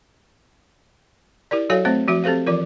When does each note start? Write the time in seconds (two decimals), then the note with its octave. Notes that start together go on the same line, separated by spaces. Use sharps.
1.51 E4 G4 A#4 D5
1.70 F#3 F#4 A4 C#5 F5 G#5
1.85 A3 C4 C5 E5
2.08 F3 F#4 E5
2.24 C4 G4 A4 C5 F5
2.46 E3 F3 F4 A#4